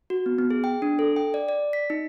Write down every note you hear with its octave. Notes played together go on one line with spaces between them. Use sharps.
F#4
B3
B3
G#4
G5
D4
A4
G5
D5
D5
B6
D#4